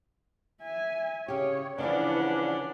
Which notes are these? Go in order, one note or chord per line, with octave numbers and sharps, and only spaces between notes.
E5 G#5
C#3 G4 C#5
C#3 E3 F3 C#4 D4 B4 F#5